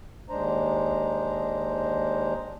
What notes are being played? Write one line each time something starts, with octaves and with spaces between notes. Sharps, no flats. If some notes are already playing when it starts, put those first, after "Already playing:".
D#2 G#3 D4 C5 A#5